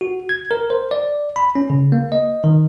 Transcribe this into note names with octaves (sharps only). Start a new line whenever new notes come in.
F#4
G#6
A#4
C5
D5
B5
C#4
C#3
A#3
D#5
D#3